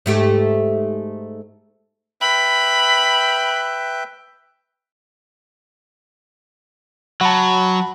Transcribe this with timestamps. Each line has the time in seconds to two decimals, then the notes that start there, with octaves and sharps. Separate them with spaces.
0.06 G#2 A3 G4
2.21 B4 E5 G5 B5
7.21 F#3 F#5 A5 B5